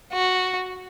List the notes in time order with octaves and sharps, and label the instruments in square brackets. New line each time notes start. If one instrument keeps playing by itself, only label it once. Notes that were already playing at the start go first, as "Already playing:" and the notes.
[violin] F#4